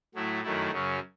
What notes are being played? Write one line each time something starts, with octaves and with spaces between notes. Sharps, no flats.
A2 F#3 A3 E4
F#2 D#3 F#3 A3 E4
F#2 C#3 F#3 C#4